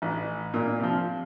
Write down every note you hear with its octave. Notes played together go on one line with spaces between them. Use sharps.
A1
A#2
C3 F3